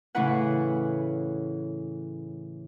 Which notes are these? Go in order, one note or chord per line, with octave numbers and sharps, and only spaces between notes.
A2 C#3 E3 E4 B4 F#5